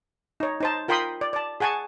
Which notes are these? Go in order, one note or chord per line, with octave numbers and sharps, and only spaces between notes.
D#4 C#5
D#4 C5 A5
F4 A#4 G5 B5 C6 D#6
D5
D5 A5
G#4 F#5 G#5 A5 C#6